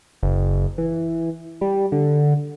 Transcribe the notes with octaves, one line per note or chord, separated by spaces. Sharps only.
F#1
E3
G3
D3